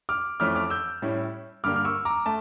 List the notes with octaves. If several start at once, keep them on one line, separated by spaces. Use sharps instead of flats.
D6 F6
F2 E3 A3 C#4 D6 F6
D6 F6
E6 G6
A2 G3 C#4 E4
G2 D3 G3 A#3 D6 F6
F6
C#6 E6
A#5 D6
A3 A5